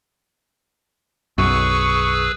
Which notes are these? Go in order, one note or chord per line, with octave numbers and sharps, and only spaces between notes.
B1 F#2 G#4 B4 C#6 E6